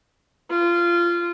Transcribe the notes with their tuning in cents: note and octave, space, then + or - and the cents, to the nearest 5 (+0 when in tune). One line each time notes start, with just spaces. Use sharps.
F4 -20